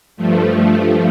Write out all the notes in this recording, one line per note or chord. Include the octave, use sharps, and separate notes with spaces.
G2 F3 A3